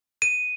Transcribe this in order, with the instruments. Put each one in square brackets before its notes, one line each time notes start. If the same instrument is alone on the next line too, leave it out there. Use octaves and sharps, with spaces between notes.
[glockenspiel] D#7